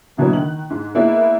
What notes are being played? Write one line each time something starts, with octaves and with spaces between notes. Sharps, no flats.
G2 B2 E3 F#3 A#3 B3
D#3 F#6 F#7
G#2
G#3 A#3 B3 E4 D5 E5